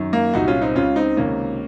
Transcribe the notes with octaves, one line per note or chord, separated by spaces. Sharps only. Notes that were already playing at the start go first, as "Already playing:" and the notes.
Already playing: F#2 D#3
A#3
C2 A#2 D#4 F#4
C#4 F4
C4 D#4
C#2 C#3 C#4 F4
C4 D#4
C#2 C3 D#3 A#3 C#4